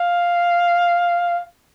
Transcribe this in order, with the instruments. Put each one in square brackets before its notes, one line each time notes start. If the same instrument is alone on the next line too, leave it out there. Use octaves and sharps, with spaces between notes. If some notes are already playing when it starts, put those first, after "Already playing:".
Already playing: [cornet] F5